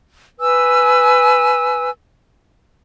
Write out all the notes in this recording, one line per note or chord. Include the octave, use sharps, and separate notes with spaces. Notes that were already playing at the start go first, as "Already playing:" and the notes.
B4 G#5 E6